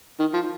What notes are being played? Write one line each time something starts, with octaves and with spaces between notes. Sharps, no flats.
D#3
F3